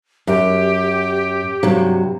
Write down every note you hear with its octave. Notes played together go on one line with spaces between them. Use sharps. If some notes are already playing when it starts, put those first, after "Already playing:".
F#2 G4
G2 C3 F#3